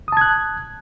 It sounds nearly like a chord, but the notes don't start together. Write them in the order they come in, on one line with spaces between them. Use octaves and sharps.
D#6 A5 G#6 F#6